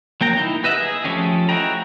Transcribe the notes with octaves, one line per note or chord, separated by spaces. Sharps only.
F#3 A#3 G5 A#5
D#4 E4
G4 B4 D#5 E5 F#5
G#4
F3 A3 C#4 G4 G#4
E4 F#4 D#5 G5 A#5